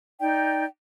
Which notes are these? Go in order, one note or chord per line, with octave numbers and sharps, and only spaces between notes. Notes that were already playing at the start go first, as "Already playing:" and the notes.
D#4 D5 G5